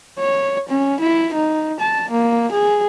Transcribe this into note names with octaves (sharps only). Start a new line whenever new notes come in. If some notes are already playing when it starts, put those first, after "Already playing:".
C#5
C#4
E4
D#4
A5
A#3
G#4